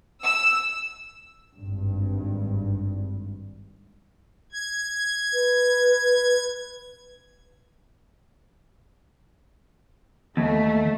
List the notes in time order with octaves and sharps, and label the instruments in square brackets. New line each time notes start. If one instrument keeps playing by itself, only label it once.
[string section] E6
[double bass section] G#1 G2
[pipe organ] G#6
[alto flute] B4
[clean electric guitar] D#2 [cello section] A3